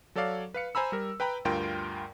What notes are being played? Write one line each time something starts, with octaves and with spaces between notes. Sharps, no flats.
F#3 A4 C#5 D5 F5
B4 F5 C#7
C5 G#5 A#5 B5 E6
G3 A#4
B4 G5 A#5 B5
D2 G2 F4 A#4 G5 C6